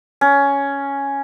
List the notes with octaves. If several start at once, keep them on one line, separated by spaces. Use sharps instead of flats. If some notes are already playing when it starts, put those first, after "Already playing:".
C#4